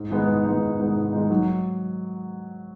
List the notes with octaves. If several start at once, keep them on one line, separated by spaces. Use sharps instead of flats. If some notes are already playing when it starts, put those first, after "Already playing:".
Already playing: G#2
D#3 G#3 B3 D#4
G#2
D#3 G#3 B3 D#4
G#2
D#3 G#3 B3 D#4
G#2
D#3 G#3 B3 D#4
F#3